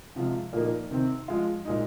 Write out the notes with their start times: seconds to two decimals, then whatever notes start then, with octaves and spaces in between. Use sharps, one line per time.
0.16 C3 F3 G#3 F4
0.53 A#2 F3 A#3 D#4
0.91 C3 D#3 C4
1.28 F3 G#3 F4
1.65 A#2 G#3 D#4